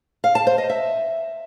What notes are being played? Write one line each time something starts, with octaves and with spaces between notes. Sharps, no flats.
F5
A5
C5
D#5
E5